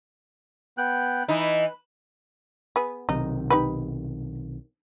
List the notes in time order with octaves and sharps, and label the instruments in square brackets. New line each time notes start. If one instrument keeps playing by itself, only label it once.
[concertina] B3 G5 F#6
[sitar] E3 D#4 [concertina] B4
[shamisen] B3 G#4
[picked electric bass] B1 C3 D#3 [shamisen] D#4
[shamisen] D#4 G4 B4